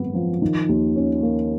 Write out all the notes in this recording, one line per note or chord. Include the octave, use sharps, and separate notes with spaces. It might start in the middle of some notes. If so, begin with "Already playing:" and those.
Already playing: G#1 F#2 B3
F3
D#3
D#2
C#4
A#3